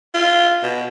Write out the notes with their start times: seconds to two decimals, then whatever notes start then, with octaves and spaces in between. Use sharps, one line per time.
0.14 F4
0.63 B2